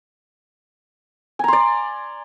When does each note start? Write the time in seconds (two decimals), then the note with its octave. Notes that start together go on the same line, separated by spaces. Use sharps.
1.39 G#5
1.44 A#5
1.48 C6
1.53 D5